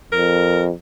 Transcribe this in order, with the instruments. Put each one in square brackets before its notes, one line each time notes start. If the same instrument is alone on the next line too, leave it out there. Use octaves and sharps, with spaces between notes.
[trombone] F2 [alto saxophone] A#4